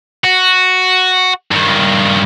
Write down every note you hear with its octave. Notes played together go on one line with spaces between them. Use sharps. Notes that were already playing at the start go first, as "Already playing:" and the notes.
F#4
G2 D#3